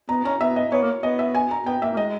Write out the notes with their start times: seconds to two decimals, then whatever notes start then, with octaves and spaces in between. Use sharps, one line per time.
0.09 B3 A#5
0.25 C#4 A#5
0.41 B3 E5
0.56 D#5
0.72 B3 C#5
0.83 A#3
1.03 B3 D#5
1.19 E5
1.35 G#5
1.51 A#5
1.66 B3 G5
1.82 A#3 E5
1.93 A#3
1.97 G#3 D#5